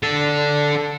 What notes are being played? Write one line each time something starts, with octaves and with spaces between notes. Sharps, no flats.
D4 A4